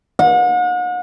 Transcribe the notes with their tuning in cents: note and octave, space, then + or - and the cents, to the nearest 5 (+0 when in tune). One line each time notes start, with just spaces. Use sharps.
F#5 -40